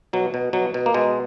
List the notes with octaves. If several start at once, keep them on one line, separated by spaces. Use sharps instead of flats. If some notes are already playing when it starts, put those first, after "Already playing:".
B2 F#3
B2
B2 F#3
B2
A#3
B2 G#3